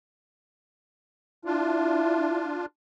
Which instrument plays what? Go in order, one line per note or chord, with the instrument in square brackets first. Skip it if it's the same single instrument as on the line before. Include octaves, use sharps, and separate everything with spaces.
[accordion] D4 F4 [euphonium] E4